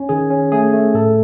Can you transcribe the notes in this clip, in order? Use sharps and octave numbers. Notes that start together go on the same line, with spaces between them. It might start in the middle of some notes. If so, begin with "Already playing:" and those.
Already playing: C#4
D#3 G#4
C#4
A3 G#4
A3
A2 A4